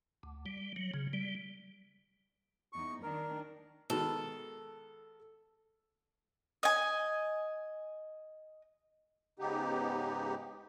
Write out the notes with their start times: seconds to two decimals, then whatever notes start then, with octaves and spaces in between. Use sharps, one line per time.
0.23 D2
0.46 G3
0.76 F#3
0.94 C#3
1.13 G3
2.73 E2 D#4 C#6
3.03 D#3 D4 A#4
3.90 B2 D#3 G#3 A4
6.63 D#5 G#5
9.39 G#2 C#3 B3 D#4 G4